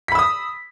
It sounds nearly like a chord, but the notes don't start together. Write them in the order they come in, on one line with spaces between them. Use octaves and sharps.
B6 B5 E6 D#6